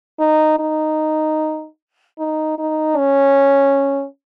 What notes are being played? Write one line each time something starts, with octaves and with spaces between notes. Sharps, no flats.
D#4
D#4
D#4
D#4
C#4